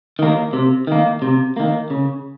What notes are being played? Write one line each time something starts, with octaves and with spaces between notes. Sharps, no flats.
D#3 A#3
C3
D#3 A#3
C3
D#3 A#3
C#3